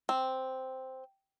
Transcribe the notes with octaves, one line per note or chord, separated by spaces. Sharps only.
C4